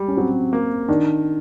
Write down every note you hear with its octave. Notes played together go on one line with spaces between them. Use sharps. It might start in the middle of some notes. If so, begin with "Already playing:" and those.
Already playing: G3 G#3
C#4
F#3 C4
A#3
D#3 D4